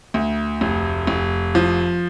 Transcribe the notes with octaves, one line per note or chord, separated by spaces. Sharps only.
D2
F1
F1
F3